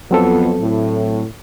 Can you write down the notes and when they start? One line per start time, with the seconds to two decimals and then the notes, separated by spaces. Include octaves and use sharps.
0.11 F2 F#3 B3 C4 A4
0.60 A2